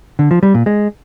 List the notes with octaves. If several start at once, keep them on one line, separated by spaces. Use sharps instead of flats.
D3
F3
G3
A#2
G#3